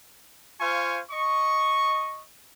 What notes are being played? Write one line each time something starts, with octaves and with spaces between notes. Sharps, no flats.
F4 C5 F5 G#5 C#6
D#5 C#6